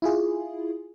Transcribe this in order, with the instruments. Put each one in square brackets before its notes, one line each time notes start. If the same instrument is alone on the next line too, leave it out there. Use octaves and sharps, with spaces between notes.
[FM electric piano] E4 F4 G#4